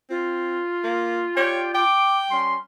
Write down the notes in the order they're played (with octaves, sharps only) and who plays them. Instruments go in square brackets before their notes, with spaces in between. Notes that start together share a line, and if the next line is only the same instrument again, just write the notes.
[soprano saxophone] C4 [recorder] F4
[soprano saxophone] A#3
[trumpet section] G4 D5 G5 [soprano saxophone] C#5
[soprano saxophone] G5 [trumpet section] D6
[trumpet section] G3 C#4 C6